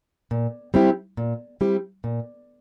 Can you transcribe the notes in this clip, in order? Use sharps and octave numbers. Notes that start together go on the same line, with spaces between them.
A#2
G3 C4 E4 G4
A#2
G3 C4 E4 G4
A#2